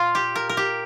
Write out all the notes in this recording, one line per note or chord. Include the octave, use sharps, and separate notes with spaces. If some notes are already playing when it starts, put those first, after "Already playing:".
Already playing: A#2 F4
G4
A#4
A#4
G4